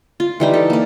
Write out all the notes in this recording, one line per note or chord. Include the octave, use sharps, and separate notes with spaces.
F4
E3 G3 D#4
A4
A#3 D5